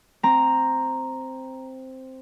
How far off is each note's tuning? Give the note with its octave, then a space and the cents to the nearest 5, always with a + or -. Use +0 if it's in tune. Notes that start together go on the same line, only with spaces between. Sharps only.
C4 +0 A#5 +0